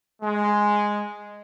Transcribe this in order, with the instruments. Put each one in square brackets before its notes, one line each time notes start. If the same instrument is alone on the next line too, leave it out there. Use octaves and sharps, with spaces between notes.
[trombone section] G#3